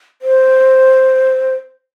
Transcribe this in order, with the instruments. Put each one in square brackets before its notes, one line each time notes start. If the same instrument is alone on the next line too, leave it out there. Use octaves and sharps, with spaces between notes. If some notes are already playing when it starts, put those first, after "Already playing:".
[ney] C5